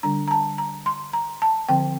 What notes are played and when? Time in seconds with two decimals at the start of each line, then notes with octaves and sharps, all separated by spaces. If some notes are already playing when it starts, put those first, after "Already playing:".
0.03 D3 G3 D4 A#5
0.28 A#5
0.31 A5
0.58 A#5
0.86 C6
1.13 A#5
1.42 A5
1.69 D3 F3 C4 G5